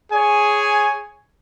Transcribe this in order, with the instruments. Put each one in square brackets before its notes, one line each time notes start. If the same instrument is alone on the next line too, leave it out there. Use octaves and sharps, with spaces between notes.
[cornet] G#4 [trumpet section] C#5 G#5